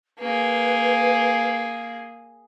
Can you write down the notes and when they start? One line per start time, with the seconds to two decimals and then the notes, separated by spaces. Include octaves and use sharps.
0.19 A#3 G#4 B4